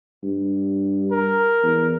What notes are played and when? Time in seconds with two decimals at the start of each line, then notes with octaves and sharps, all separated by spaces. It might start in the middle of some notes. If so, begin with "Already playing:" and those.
0.23 G2
1.12 A#4
1.63 E2